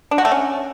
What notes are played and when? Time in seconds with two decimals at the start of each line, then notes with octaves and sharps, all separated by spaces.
0.11 D4
0.18 F#4
0.25 A3
0.32 C#4